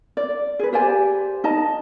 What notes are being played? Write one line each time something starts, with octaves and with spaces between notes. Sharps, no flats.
D5
G#4 B4
G4 C5 D5 G#5
D#4 D#5 A5